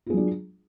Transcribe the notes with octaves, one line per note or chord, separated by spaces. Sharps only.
F#3 D4 F4 G#4